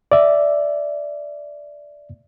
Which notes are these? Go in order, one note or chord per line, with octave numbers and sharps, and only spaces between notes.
D5 E5